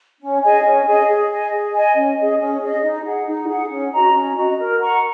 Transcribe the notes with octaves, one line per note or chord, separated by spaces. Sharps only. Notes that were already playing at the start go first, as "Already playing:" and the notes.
C#4
G#4 D#5 G#5
C#4
G#4 D#5 G#5
G#4
D#5 G#5
G#4
D#5 G#5
C#4
G#4 D#5
C#4
G#4 D#5
D#4
G#4 F#5
D#4
G#4 F#5
C#4
F#4 D#5 A#5
C#4
F#4 D#5 A#5
A#4
F#5 A#5 C#6